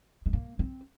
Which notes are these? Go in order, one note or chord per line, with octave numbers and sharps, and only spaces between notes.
G#3
A#3
C4